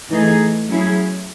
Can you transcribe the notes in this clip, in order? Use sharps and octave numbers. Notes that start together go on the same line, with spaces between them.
E3 A3 D#4 G#4
F#3 C#4 E4 G#4